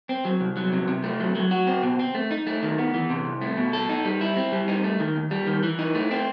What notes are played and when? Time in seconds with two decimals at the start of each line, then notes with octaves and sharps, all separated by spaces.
0.09 C4
0.25 F#3
0.41 C2
0.57 F#3
0.73 C3
0.88 C3
1.04 A3
1.20 F#3
1.35 F#3
1.51 F#4
1.67 C4
1.83 B2
1.99 C4
2.15 A3
2.31 D#4
2.47 A3
2.63 D#3
2.78 B3
2.94 E3
3.10 C3
3.26 C2
3.42 A3
3.57 B2
3.73 A4
3.89 D#4
4.05 G3
4.21 E4
4.37 C4
4.52 G3
4.68 D#4
4.84 A3
5.00 D#3
5.16 D#2
5.31 G3
5.47 D#3
5.63 E3
5.79 D#4
5.95 A3
6.11 C4